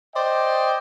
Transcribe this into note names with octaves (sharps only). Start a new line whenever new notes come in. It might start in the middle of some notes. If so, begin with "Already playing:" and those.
C5 D5 D#5 G5